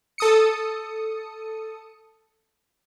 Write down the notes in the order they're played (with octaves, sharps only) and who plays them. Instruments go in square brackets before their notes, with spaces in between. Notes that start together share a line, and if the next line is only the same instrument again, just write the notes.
[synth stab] A4 D#6 C#7